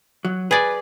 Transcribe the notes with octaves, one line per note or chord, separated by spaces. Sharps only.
F#3
G#4 B4 D5